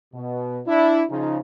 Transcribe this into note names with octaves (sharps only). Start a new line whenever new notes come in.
B2
D4 E4
C#3 F3 D#4